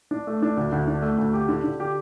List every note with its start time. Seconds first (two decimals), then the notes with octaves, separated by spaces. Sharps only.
0.11 D4
0.27 A3
0.42 D4
0.57 D2
0.72 D2
0.87 D4
1.02 A3
1.18 D2
1.33 G4
1.49 D3
1.64 D3
1.80 G4